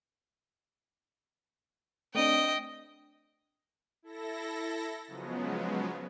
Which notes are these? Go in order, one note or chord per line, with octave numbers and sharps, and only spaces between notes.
A3 C4 D4 D#5 G5
E4 A4 A#6
C#3 F3 F#3 G#3 B3